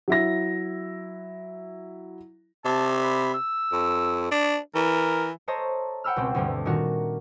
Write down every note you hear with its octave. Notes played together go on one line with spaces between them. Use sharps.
F#3 E4 A#6
C3 A5
B5
E6
F2
D4
E3 A#4
A4 C5 C#5 D#5 A5 A#5
F#5 G5 B5 E6 F6
C#2 B2 C4
D2 G2 D3
A#2 D#3 D4 F#4 A#4